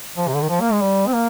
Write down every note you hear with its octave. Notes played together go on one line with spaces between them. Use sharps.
F3
C3
D3
D#3
F3
A#3
G#3
G3
C4
A#3